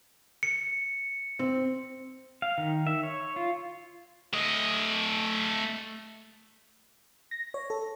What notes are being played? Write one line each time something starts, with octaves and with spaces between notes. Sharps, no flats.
C#7
C4
F5
D#3
E5
C#5
F4
A3 D#5
A#6
C#5
A4